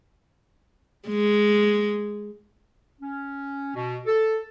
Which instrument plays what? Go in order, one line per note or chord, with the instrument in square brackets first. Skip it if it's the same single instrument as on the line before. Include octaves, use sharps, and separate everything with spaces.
[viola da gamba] G#3
[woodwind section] C#4
B2
A4